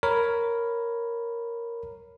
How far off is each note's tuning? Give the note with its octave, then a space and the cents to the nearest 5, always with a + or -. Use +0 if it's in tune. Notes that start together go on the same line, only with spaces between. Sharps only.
A#4 +0 C#5 +0 B5 +0